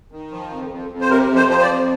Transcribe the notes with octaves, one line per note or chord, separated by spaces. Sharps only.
D#3
F3
F2
F2
F2
C5
C3 A#4
F2
C5
F3 C5
D5
F2